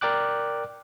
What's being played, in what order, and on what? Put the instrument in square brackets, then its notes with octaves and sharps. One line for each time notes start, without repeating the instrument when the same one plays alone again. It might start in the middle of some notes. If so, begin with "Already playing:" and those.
[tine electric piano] A#4 D5 G5 D6 F#6